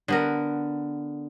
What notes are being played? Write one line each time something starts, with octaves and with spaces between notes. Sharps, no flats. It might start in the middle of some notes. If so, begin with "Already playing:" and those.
D3 B3 A#4